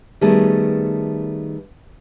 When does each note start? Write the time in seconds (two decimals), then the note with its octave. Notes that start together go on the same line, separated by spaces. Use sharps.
0.21 D#3 G3 A3 B3 G#4 A5